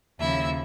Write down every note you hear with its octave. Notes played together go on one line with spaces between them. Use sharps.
D#2 C#3 F3 E4 E5